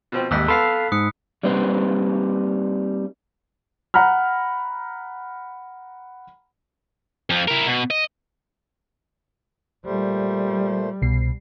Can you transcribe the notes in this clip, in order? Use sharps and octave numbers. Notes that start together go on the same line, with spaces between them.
B2 F3 C4
A1 D#2 G#2 G3 E6 F#6 B6
B3 A4 F5 A5 B5 C6 B6 C7
G#2 D#6 F#6 C#7
G3 A#3 C4 D#4 B4 C5
F#5 A#5 B5 F6
F2 F3
E4 A#4
B2
D#5
A#2 G3 A3 C5
C2 B2 C7